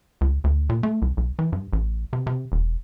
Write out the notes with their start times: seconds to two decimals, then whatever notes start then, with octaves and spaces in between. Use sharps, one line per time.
0.21 C#2
0.44 D2
0.69 A#2
0.83 A3
1.02 C2
1.17 B1
1.39 E3
1.52 G2
1.73 A1
2.13 C3
2.27 C3
2.52 E1